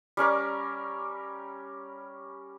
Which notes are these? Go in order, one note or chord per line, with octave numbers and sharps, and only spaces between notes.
G3 C#4 A#4 D6